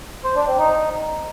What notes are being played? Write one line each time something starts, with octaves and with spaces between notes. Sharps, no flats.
C5
D4
C4
D#4